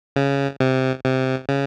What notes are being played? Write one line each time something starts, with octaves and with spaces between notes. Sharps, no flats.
C#3
C3
C3
C#3